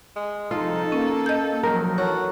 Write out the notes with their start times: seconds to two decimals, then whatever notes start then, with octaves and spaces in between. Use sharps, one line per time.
0.16 G#3
0.51 C2 F3 D#4 F4 A4
0.92 A#3 C#4
1.26 D#5 G6
1.63 D#3 F3 F#3 A#4
1.98 E3 F#4 A4 C#5 A5